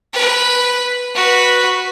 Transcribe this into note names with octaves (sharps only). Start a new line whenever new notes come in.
B4
F#4 B4